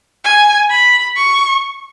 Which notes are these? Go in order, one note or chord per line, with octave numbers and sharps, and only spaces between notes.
G#5
B5
C#6